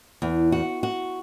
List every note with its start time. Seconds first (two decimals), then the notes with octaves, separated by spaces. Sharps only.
0.22 E2
0.52 F#4
0.83 F#4